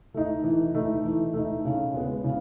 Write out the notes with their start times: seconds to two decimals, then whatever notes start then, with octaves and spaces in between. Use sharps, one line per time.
0.14 A3 D#4
0.44 E3
0.74 A3 D#4
1.04 E3
1.34 A3 D#4
1.65 C#3
1.94 G#3 B3
2.24 C#3